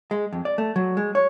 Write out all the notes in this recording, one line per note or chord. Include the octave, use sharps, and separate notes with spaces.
G#3
F2
D5
A3
F#3
G#3
C#5